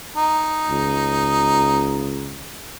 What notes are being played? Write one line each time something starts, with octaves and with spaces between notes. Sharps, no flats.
D#4
C#2